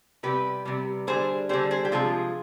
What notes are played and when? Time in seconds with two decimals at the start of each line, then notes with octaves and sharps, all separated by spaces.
0.23 C3 G3 G4 B4
0.65 C3 G3
1.07 D3 G3 G#4 C5
1.49 D3 G3 G#4 C5
1.71 G#4 C5
1.85 G4
1.92 C3 F3 G#3 F4 G#4